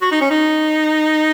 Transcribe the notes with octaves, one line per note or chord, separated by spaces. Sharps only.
F#4
D#4
C#4
D#4